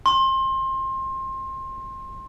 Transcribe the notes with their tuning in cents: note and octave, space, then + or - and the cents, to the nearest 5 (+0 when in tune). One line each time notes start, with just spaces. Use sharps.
C6 +25